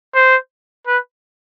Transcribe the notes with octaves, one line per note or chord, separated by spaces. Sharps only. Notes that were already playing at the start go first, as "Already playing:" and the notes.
C5
B4